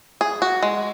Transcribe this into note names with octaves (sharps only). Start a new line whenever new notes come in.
G#4
F#4
G#3